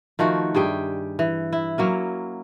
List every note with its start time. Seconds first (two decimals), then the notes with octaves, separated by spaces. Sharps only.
0.19 D#3 F3 A3 F#4
0.55 G2 G3 G#4 G5
1.19 E3
1.53 E4
1.78 F#3 A#3 C#4